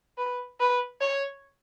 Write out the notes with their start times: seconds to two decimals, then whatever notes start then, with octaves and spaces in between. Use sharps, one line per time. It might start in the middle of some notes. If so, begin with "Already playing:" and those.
0.18 B4
0.60 B4
1.01 C#5